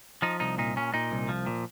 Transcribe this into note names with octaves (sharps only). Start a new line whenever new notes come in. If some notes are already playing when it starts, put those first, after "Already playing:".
F3 D#4
C2 D#4
A#2 D#4
A#2 C#4
A#2 D#4
C2
F3
A#2